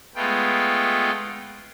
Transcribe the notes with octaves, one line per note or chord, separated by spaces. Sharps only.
G#3 A3 B3 F4 G5